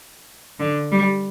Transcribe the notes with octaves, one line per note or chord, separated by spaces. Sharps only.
D3
G3